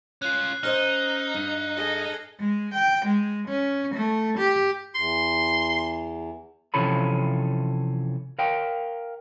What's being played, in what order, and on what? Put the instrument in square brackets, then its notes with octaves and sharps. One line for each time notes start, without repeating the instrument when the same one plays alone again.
[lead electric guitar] C#4 F4 [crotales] F#6 C7
[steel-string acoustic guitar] C#4 C5 D#5 [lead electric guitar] D#4 [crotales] F6 [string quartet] G6
[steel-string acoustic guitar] G2
[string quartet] G#4 A4 D#5
[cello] G#3
G5
G#3
C#4
A3
G4
[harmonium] E2 [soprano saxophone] C6
[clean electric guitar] C3 E3 F3 C#4 A4 B5
A#4 F5 G5